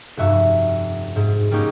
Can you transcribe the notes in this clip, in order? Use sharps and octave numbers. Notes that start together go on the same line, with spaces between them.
F1 G2 F#4 E5
G#2
G3 A#3 C#4 D#4 F#4